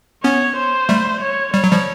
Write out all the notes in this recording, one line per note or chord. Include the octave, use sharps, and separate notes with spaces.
B3 C#4 C#5
C5
G3 A3
C#5
G3 C#5
F#3
F3 G3